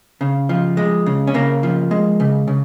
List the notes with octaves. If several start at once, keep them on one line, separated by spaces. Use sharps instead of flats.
C#3
F3
G#3
C#3
C#4
C#3 A#3
F3
G#3
C#3
C#3